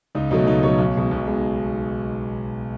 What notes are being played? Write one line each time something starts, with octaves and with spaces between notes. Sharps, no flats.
C#2 D#4
B2 F#3 A3 D#4
C#2 D#4
B2 F#3 A3 C#5
B1
B2 G#3
B1
B2 G#3